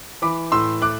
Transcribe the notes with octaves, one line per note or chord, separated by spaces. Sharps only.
E3 B5 D6
A2 C6 E6
A3 D6 F#6